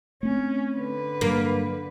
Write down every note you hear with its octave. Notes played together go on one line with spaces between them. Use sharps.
A3 C4 C#4
D3 B4
G2 F#3 A#3